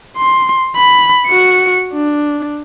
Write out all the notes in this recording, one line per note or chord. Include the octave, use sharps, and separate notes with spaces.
C6
B5
F#4 C#7
D4